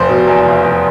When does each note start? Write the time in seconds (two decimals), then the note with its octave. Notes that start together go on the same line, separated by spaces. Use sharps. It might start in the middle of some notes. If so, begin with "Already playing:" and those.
Already playing: F1 C5
0.09 B2
0.28 E2
0.46 F1
0.64 F1